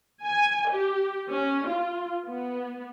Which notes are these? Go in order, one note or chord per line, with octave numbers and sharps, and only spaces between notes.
G#5
G4
C#4
F4
B3